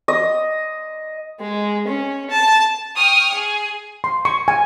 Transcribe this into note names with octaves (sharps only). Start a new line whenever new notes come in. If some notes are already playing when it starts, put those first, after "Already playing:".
D#5
G#3
C#4
A5
G5 C#6 D#6 F6
G#4
C6
C#6
G#5